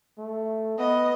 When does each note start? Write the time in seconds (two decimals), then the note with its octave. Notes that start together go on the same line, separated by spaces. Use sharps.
0.18 A3
0.78 B3 D#5